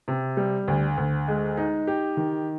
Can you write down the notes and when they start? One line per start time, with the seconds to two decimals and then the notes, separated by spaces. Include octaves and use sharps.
0.08 C3
0.37 G3
0.68 D2
0.97 D2
1.28 G#3
1.57 D#4
1.87 G4
2.17 D#3